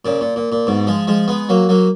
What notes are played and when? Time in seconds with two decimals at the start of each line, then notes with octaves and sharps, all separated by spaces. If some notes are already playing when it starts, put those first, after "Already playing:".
0.05 A#2 C#3
0.21 A#2
0.36 A#2
0.52 A#2
0.67 G#2 B2
0.87 F3 G#3
1.07 F3 G#3
1.28 G#3 B3
1.49 F#3 A#3
1.69 F#3 A#3